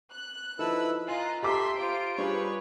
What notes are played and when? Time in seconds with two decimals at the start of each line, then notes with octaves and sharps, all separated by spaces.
0.11 F#6
0.59 F3 D#4 E4 A4 B4 E6
1.08 F4 D#5 G#5 A#5 F#6
1.43 G4 A4 E5 A#5 C6 D6 B6
1.76 F4 C5 D7
2.18 G3 F4 G#4 B4 C#5